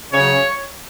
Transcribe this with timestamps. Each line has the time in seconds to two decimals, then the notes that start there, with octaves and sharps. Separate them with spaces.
0.13 C#3 F#3 C#5